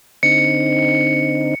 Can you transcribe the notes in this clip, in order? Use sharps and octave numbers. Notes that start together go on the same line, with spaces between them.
D3 C4 D#4 C#7